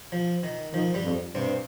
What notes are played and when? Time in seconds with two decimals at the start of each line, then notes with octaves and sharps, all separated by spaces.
0.12 F3
0.43 D#3
0.73 D#3 F3
0.94 G2 G3
1.04 F2
1.35 G2 C3 C4